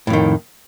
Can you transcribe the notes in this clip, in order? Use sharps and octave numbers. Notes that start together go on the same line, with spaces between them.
F2 A2 D#3